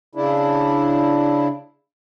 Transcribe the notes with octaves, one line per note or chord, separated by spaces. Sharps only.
C#3 D4 E4